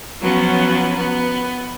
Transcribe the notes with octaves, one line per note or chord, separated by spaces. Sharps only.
F3 F#3 B3 C#4
B3